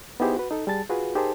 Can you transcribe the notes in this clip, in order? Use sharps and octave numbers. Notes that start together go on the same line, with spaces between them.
B3 D#4 E4 G4 G#4 C5
F#4 B4
D#4 A4
G3 G#4 A5 A6
F4 F#4 G#4 B4
D#4 G4 G#4 A#4 C5 A5